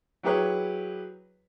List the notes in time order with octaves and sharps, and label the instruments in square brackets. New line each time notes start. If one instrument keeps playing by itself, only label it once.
[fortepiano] F#3 E4 G4 G#4 B4 C#5